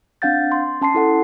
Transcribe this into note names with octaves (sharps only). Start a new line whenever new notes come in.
C4 D4 F5 F#5 G6 A6
C6
C#4 A5 C6 C7
E4 A4 F#5